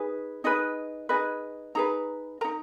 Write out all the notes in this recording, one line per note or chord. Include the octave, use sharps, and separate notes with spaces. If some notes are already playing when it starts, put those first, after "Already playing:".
Already playing: D#4 G#4 B4
D#4 G#4 B4 D#5
D#4 G#4 B4 D#5
D#4 G#4 B4 A#5
D#4 A#4 A#5